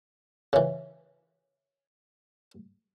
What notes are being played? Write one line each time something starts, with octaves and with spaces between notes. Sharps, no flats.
C#3 E3